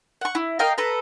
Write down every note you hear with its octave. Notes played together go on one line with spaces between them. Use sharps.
F#5 C#6
E4
A#4 D#5 F5 G5
A4 B4 A#5